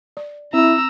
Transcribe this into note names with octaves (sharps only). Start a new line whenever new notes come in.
D5
C4 E4 A#5 E6